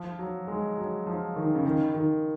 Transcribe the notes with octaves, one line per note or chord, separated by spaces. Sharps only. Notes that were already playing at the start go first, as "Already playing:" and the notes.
Already playing: F3
F#3
G#3
F#3
F3
D#3
C#3
D#3
D#3